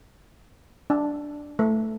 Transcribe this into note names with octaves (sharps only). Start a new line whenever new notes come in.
D4
A3